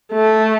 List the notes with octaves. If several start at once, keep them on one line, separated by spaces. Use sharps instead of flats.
A3